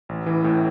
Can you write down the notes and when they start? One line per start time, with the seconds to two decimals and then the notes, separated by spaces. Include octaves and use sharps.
0.09 A1
0.26 E3
0.44 A2